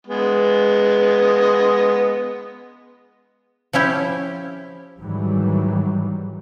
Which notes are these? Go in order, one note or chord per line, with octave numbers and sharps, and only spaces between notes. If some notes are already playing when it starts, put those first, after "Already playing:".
G#3 B3
F3 C#4 E4 G4
G#2 D#3 E3 F#3 G3